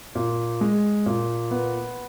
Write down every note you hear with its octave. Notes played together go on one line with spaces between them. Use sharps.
A#2
G#3
A#2
B3